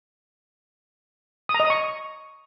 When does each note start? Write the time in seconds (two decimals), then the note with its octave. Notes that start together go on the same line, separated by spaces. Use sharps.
1.49 D#6
1.54 A#5
1.60 D#5
1.65 D#6
1.70 C#6